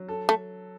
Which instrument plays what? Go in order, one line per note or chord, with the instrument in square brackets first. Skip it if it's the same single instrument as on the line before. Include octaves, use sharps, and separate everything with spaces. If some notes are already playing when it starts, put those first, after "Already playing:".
Already playing: [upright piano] F#3
A4
[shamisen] A3